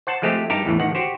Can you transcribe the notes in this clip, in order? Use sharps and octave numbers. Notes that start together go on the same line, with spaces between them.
C5 F#5 A5
F3 G#3 A3 C4 G4
G2 D#4 G4 A#4 A5
E2 A2 E3
A1 D#3 F#5
F#4 G4 C5